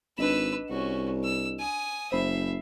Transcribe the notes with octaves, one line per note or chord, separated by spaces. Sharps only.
G#1 D4 B4 D#5 E6 E7
C2 C#4 F#4
E6
G#5 D#6
F#1 C5 E5 B5 C7